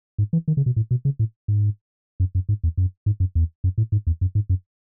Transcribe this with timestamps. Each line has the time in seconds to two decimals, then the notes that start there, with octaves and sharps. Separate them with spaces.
0.18 G#2
0.33 E3
0.48 D#3
0.57 C#3
0.66 B2
0.76 A2
0.91 B2
1.05 C#3
1.19 A2
1.48 G#2
2.20 F#2
2.35 F#2
2.49 G#2
2.64 E2
2.77 F#2
3.06 G#2
3.20 F#2
3.35 E2
3.64 F#2
3.78 A2
3.92 G#2
4.07 E2
4.21 F#2
4.35 G#2
4.50 F#2